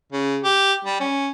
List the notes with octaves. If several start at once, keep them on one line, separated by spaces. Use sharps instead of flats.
C#3
G4
G3
C#4